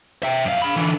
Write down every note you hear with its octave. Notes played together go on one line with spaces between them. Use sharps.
E5 G5
F#2 F5
F5 B5
D3 E3